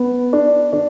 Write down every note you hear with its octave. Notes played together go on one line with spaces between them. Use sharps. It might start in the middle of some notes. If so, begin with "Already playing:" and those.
Already playing: B3
D4
D4